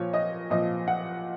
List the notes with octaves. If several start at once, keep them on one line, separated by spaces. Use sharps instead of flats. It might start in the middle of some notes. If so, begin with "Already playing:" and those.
Already playing: A#2 F3 C#5
D#5
A#2 F3 D#5
F#5